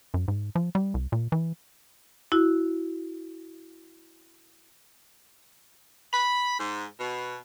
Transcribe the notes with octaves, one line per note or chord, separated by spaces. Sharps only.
F#2
G#2
F3
G3
C2
A#2
E3
E4 F#4
B5
G#2
B2